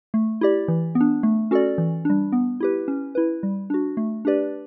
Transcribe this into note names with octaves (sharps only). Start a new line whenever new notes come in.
A3
E4 G4 D5
E3
B3
D4
A3
C#4 F#4 A4 D5
E3
G3 D4
B3
E4 G4 B4
C#4
E4 B4
G3
D4 F#4
A3
D4 G4 B4 D5